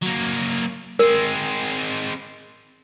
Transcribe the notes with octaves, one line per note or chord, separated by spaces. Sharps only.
F#3 A#3
G#3 C4 A#4